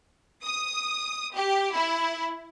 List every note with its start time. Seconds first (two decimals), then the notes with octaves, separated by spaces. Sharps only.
0.44 D#6
1.33 G4
1.74 E4